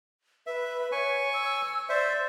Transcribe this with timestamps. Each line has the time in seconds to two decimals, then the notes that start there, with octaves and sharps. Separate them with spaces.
0.47 B4 E5
0.92 C#5 G#5 C#6
1.33 E6
1.89 C5 D5 E5